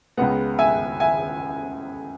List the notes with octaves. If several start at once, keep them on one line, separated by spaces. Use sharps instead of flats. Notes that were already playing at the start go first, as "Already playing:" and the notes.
C#2 C#3 G#3 B3 F#5
E5 G#5
E5 G#5